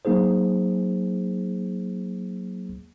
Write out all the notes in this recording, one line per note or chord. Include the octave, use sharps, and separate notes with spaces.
F#3 A#3 D#4 G#4 C5